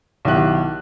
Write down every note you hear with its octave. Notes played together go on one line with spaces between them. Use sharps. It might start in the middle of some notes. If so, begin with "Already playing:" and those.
B1 D#3 E4 G4 F#6